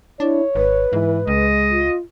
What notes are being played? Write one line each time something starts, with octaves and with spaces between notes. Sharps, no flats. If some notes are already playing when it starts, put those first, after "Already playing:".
D4 E4 C#5
G#1 B4
G#2 E3
C#2 G#3 D#5
F4